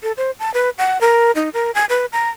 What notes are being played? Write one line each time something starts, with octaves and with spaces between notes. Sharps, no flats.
A4
C5
A5
B4
F#5
A#4
D#4
A#4
G#5
B4
A#5